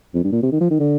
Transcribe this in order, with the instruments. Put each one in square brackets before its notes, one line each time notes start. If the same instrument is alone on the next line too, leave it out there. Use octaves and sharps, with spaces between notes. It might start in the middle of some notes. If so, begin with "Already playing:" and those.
[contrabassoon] F2
G2
A#2
C3
D#3
F3
D#3
D3